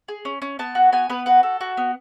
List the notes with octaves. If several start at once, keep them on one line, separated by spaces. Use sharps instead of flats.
G#4
C#4
C#4
B3 A5
F#4
B3 G#5
B3 B4
F#4 B4
A4
F#4
B3